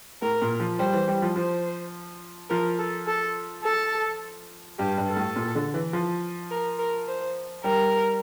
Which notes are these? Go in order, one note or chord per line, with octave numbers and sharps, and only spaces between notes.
A2 A#4
A#2
F3
G3 C5
E3
G3
F3
F3 C5
F3 A#4
A4
A4
A4
G2 G4
G2
A4
A2
A#2
D3
E3
F3
A#4
A#4
C5
G3 A#4